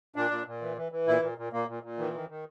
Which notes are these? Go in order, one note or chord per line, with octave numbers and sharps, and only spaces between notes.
A#2 D4
A#2
A#2
E3
E3
E3
A#2 E4
A#2
A#2
A#2 A#3
A#2
A#2
D#3 E3
D#3
D#3